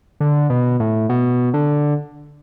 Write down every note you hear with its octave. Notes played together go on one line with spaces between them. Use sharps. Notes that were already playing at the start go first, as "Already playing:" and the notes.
D3
B2
A2
B2
D3